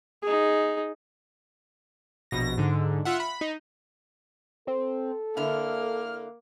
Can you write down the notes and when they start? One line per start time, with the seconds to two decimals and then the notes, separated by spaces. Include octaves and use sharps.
0.23 D#4 G#4
2.31 A#1 B2 A#6
2.58 G#2 D3
3.05 F4 E5 F#5
3.20 B5
3.41 D#4
4.67 C4 A4
5.37 D3 A#3 E4 F6